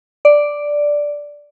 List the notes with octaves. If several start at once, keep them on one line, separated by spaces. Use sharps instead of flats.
D5